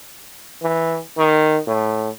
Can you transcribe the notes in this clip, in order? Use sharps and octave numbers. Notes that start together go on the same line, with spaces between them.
E3
D#3
A2